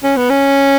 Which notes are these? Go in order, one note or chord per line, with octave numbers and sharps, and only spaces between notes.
C#4
B3
C#4